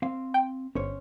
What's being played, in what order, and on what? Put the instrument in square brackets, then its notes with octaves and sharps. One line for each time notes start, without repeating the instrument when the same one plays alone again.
[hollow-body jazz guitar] C4 F5
[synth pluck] G5
[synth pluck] G1 [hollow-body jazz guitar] C#4 C5 C#5